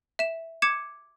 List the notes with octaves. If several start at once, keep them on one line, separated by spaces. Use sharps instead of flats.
E5 E7
D6 G#6 C#7 E7